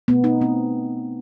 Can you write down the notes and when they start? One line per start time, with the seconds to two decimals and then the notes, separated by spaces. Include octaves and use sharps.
0.08 B2 A3 B3
0.24 D#4
0.41 B2 A3 C4